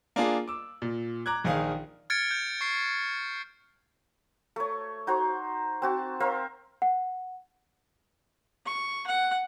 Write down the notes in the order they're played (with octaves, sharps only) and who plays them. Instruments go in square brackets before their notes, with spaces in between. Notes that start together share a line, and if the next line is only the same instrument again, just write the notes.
[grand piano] A#3 D4 F4 G#4
D6 E6
A#2
A#5 D6 F#6 G#6
A#1 D#3 G#4 F5
[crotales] F6 G#6 A6 C#7 D7
G6
C#6 C7
[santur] A3 C#5
D#4 F#4 C5 A#5
C4 F#4 A5
A#4 C5 E5 F5
[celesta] F#5
[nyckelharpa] C#6
F#5